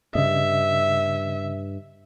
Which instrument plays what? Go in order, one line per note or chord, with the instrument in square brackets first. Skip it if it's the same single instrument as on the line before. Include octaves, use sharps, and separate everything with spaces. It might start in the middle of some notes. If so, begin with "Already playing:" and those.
[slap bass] G2 [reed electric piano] C#3 D#5 [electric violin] E5